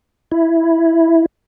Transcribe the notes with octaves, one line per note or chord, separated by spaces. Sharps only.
E4